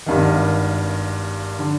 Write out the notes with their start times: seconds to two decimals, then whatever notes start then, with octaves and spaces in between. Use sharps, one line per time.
0.06 G#1 G2 D#3
1.59 D3